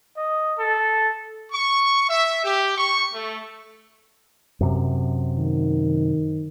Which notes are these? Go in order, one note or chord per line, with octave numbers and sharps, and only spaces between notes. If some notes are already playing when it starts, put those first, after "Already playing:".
D#5
A4
C#6
E5
G4
C#6
A3
F#2 C3
D#3